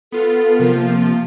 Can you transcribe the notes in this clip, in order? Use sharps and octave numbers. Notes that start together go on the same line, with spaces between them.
B3 F4 A4
C3 F3 F4 A#4
A#3